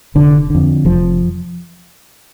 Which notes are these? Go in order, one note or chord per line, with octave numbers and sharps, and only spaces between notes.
F1 D3
F2 D3
F1 F3